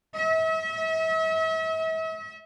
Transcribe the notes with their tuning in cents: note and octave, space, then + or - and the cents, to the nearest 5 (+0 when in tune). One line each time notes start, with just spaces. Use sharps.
E5 -40